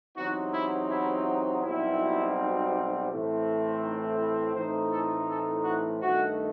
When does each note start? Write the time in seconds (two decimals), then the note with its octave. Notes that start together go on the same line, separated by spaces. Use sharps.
0.17 E2 C3 F#3 C4 D#4 F#4
0.53 E4
0.90 E4
1.62 B1 B2 G3 C4 D#4 E4
3.09 A2 E3 A3 C4
3.82 D#4
4.18 E4
4.55 A2 E3 A3 C4 D#4 C5
4.91 A4
5.28 A4
5.64 F#4
6.01 G2 D#3 A3 D#4 F#4